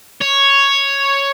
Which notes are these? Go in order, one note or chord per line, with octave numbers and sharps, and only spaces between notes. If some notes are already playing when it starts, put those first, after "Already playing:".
C#5